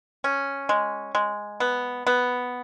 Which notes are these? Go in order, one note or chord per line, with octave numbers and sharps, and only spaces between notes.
C#4
G#3
G#3
B3
B3